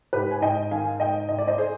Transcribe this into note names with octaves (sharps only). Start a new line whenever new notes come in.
G#2 G4 B4
G#5
G#2 D#5 G5
D#3 F5 G#5
G#2 D#5 G5
G#2 D#5
D5
C5 D#5
G#4 C5